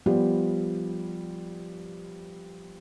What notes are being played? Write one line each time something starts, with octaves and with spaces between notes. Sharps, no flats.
F3 G3 B3